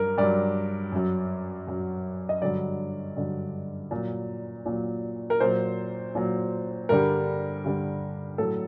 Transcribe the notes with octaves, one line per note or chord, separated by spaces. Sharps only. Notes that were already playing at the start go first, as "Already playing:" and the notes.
Already playing: G2 F#3 A#4
G2 F#3 D5
F#2 F#3
F#2 F#3
D#5
G2 D3 F#3 D5
G2 D3 F#3
A#2 F#3
A#2 F#3
A#4
A#2 F#3 C5
A#2 F#3
G2 D3 G3 A#4
G2 D3 G3
A2 F#3 A4